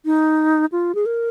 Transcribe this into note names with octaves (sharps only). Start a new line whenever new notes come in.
D#4
F4
G#4
A#4